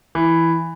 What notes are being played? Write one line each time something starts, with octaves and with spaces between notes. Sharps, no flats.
E3